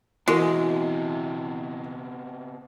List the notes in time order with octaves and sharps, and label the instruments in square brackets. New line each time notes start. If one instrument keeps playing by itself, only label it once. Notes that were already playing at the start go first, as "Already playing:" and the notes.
[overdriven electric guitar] B2 C4 [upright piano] E3 [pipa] G#3 [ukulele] F#4 A#4 D#5